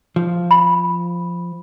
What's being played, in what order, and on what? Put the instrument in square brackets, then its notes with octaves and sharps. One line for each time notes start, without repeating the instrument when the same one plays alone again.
[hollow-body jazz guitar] F3
[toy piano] B5